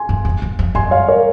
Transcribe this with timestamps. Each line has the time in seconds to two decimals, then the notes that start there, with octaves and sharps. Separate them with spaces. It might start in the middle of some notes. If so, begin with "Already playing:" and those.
Already playing: G#5 C6
0.09 F#2
0.25 F2
0.42 F#2
0.59 F2
0.75 F#2 G#5 C6
0.91 C#5 F5
1.09 A#4 C#5